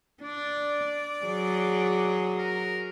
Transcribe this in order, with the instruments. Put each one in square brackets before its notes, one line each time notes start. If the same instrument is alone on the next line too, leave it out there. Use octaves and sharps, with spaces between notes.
[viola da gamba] D4 [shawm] D5
[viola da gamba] F#3 G#4
[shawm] A#4